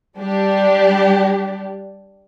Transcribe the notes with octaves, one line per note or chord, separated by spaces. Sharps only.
G3 D4 G4